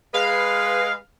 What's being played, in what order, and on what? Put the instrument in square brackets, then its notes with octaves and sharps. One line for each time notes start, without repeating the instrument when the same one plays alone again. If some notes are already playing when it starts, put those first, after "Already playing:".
[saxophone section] G#3 B4 [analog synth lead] F5